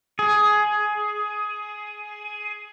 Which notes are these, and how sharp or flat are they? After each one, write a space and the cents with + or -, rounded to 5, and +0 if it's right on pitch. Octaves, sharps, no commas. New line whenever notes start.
G#4 +15